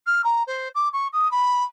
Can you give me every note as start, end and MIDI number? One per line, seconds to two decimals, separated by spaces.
0.06 0.21 89
0.24 0.43 82
0.47 0.68 72
0.75 0.88 86
0.93 1.07 85
1.13 1.30 87
1.31 1.63 83